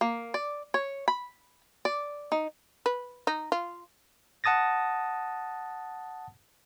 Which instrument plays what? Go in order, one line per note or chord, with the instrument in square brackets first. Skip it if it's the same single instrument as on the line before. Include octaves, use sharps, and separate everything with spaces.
[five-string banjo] A#3
D5
C#5
B5
D5
D#4
[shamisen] B4
D#4
F4
[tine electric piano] F#5 A5 D#6 A6 A#6